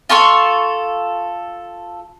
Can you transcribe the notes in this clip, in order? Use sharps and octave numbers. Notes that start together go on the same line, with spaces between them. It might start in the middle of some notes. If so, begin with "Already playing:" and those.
F4 A4 C6 C#6